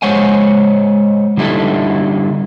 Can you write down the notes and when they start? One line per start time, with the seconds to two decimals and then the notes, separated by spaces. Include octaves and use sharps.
0.02 G#3 C5 C#5 F#5 G#5
1.37 D3 G3 D#4 E4 A4